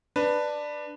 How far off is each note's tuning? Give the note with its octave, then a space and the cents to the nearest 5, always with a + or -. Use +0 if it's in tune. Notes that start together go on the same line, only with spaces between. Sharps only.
D4 +10 B4 +0